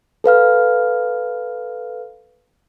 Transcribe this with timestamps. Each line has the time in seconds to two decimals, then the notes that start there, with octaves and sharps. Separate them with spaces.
0.24 A4 B4 F5 F6